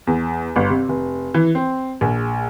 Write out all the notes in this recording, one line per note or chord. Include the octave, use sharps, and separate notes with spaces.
E2
G1
C3
F1
E3
C4
A#1